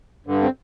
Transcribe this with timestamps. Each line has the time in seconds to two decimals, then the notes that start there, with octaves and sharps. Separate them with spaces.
0.27 G2 D3
0.43 C4